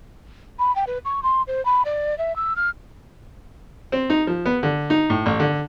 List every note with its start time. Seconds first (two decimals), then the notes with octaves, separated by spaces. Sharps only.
0.59 B5
0.76 G5
0.87 B4
1.05 C#6
1.23 C6
1.47 C5
1.65 B5
1.85 D5
2.18 E5
2.36 E6
2.56 F6
3.92 C4
4.10 D#4
4.27 F3
4.46 B3
4.63 D3
4.90 D#4
5.10 A2
5.26 A1
5.40 D3